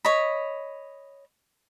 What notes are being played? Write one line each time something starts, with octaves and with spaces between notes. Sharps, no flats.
C#5 D#5 B5